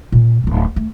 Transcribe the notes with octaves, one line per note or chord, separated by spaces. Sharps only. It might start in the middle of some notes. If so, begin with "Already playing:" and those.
A#2 C#4
D1 A#1
A3